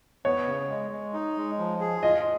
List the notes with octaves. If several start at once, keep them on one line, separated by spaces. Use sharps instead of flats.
B3 C#5
C#3
G#3
G#3
D#4
G#3
F3
G#4
F4 D#5